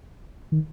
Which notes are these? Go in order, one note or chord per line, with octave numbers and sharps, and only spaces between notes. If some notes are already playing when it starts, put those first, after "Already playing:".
D#3